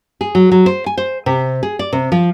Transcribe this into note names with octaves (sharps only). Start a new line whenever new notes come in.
G#4
F#3
F#3
C5
G#5
C5
C3
G#4
D5
C3
F3